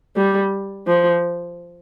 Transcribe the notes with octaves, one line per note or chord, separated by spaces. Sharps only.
G3
F3